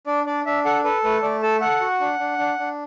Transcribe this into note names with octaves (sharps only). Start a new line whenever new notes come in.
D4 D5
D4 D5
D4 E5
A4 F#5
A4 B4
A3 B4
A3 D5
A4 A5
A4 F#5
F#4
D4
D4
D4
D4